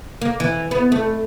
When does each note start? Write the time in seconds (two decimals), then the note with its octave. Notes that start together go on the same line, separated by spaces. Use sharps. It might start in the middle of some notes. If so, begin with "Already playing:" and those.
0.22 A#3
0.40 E3
0.71 B3
0.92 A3